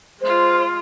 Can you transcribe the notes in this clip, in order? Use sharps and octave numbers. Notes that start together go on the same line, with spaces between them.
G#3 F4 C5